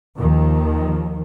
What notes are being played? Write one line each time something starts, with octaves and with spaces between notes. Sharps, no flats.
D#2 D#3 F3